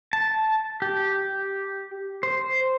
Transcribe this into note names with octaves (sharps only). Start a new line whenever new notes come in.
A5
G4
C5